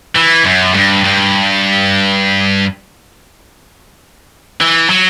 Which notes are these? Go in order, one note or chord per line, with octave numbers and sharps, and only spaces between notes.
E3
F#2
G2
G2
E3
F#3